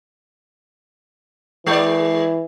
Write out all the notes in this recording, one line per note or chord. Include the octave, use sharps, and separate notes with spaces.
E3 G#3 D5